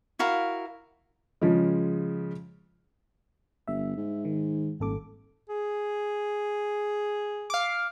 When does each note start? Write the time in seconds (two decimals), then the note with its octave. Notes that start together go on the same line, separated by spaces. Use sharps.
0.19 E4 F#4 A#4 F5
1.41 C#3 F3 G#3
3.68 G1 E5
3.96 G#2
4.25 D#3
4.80 D#1 G#1 A4 D6
5.49 G#4
7.50 F5 D6